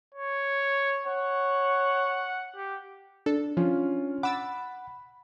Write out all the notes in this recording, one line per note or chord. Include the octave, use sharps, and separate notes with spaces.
C#5
C#5 F#5
G4
D4 A4
F3 C#4 F4
F#5 B5 D6 E6 A6